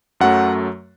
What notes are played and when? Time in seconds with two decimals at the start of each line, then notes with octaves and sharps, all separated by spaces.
0.20 F#2 F#3 A3 F#5